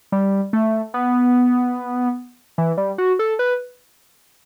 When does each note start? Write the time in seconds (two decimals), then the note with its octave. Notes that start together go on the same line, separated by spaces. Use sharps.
0.12 G3
0.53 A3
0.94 B3
2.58 E3
2.78 G3
2.98 F#4
3.19 A4
3.39 B4